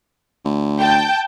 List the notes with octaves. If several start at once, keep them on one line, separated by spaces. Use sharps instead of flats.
D2
G5 A5 G6